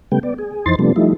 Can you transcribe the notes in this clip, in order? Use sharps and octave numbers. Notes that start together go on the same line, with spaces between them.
C#3 G3 A3 B3 G5
B3 D5
G#4
F2 E3 D#4 C5 C6 A6
C3 F3 G3 A3 B3 D4
F3 G3 A3 D#4 E4